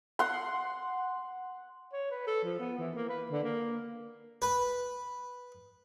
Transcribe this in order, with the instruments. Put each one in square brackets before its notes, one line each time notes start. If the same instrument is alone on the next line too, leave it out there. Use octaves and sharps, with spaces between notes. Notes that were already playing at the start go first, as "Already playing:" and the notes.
[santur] F#5 C6
[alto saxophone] C#5
B4
A4
F3
B3
E3
A#3
B4
D3
A#3
[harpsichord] B4